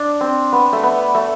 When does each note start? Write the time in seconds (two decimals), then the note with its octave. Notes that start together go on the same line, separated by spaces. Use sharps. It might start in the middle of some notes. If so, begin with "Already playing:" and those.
Already playing: D4
0.21 C4
0.52 B3
0.73 A3
0.83 B3
1.14 A3